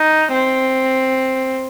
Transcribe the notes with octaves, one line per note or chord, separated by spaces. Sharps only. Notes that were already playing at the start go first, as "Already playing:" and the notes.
Already playing: D#4
C4